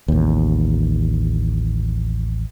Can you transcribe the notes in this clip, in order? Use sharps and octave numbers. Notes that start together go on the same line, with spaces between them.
A1 D#2